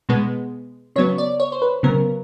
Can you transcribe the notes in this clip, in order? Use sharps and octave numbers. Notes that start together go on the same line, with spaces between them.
B2 G#3 B3
C#3 F#3 B3 C#5
D5
C#5
C5
B4
C#3 F#3 B3 A#4